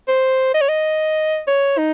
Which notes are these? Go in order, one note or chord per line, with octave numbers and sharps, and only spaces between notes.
C5
D#5
C#5
D#5
C#5
D#4